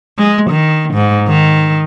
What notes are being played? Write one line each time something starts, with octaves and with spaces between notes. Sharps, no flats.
G#3
D#3
G#2
D#3